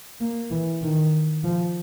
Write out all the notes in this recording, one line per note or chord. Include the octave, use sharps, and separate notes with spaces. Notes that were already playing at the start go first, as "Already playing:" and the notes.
A#3
E3
D#3
F3